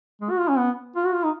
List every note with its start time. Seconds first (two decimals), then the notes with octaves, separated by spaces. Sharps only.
0.21 G#3
0.30 F#4
0.39 F4
0.48 C#4
0.58 B3
0.96 F4
1.06 F#4
1.14 F4
1.23 D#4